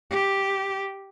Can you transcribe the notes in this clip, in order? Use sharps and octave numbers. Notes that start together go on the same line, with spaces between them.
G4